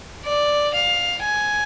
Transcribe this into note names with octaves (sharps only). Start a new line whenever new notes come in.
D5
F5
G#5